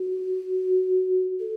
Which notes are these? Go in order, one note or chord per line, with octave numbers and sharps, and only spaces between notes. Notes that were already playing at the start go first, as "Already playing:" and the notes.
Already playing: F#4
A4